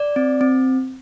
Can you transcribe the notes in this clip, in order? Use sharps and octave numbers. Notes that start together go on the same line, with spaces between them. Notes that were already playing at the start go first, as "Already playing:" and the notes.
Already playing: D5
C4
C4